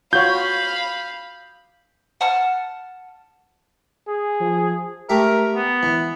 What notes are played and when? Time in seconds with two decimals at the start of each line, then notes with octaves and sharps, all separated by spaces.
0.13 F4 F#4 C#5 F5 B5 G6
2.21 F#5 A5 F6
4.07 G#4
4.40 F3
5.09 A3 G4 A#4 E5
5.56 B3
5.83 E3